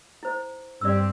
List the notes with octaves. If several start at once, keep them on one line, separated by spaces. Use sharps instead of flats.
E4 C5
G2 C4 G4 D5 E6